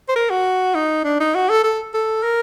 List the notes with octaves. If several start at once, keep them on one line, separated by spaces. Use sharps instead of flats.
C5
A#4
F#4
D#4
D4
D#4
F#4
A4
A4
A4
A#4